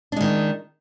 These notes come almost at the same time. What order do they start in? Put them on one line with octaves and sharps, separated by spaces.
D4 G#3 D#3